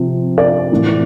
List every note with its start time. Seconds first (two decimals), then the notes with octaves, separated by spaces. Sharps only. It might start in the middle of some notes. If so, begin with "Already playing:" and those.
Already playing: C3 F3 C4
0.38 D5
0.72 A2 E3 A3 C4